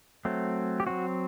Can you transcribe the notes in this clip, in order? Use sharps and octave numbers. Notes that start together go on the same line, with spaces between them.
F#3 A3 C4
G4
F#3 C4 F#4